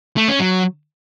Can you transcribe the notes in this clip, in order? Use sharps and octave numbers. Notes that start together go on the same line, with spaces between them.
A3
C#4
F#3